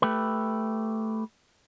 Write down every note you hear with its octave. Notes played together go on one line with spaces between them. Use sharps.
A3 G4 B4